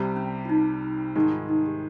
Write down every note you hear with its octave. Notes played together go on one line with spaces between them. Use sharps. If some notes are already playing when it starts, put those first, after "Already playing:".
Already playing: C2 C3 G3
C#4
F4
D#4
G#2 D#3 G#3 D#4
F4
D#4
G4